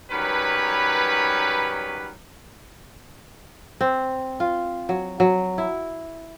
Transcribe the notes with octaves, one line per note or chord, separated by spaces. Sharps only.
D#3 F#3 G3 C#4 B4
C4
F4
F#3
F#3
E4